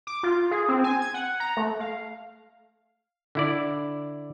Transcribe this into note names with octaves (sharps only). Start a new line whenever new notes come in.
D6
F4
G#4
C4
G#5
G#6
F#5
A#5
A3
F5
D3 E4 D5